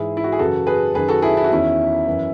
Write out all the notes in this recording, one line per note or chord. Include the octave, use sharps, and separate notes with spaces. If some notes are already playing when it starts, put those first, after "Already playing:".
Already playing: G#2 E3 E4 G#4
E4
F#4
G#4
F#2 C#3 E3 F#4 A4
G#4 B4
F#2 D#3 G#4 B4
F#4 A4
E4 G#4
E4
F#4
E2 D#3 C#4 E4
F#2 E3